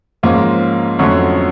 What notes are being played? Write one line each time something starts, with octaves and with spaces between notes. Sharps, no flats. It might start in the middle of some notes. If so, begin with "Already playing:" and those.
G#2 F3 A#3 C#4 F4
F2 D3 F#3 A3 C#4